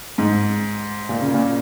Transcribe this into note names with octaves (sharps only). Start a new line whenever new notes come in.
G#2
A#2
C#3
A#2